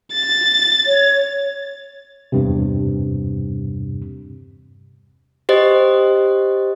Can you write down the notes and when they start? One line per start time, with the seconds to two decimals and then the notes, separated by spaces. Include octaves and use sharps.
0.14 A6
0.87 C#5
2.32 E2 G2 C3
5.49 G4 C5 D#5